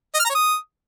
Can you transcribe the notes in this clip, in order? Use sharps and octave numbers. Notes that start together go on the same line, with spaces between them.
D#5
F6
A#5
C#5
D#6